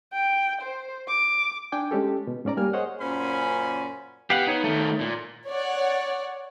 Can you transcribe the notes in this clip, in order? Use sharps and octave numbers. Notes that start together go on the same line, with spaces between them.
G5
C5
D6
D4 G5 G#5 D6
G#3 C#4 G4 A4
B2
G#2 C#4 D5 A#5
G3 A#3 G#5 F6
G#4 C5 C#5 D#5 F#5
F#2 A#2 C#4 C5 G#5 B5
B3 G4 F5 F#5
D#4 C#5
D#3 A3
A#2
C#5 D5 F#5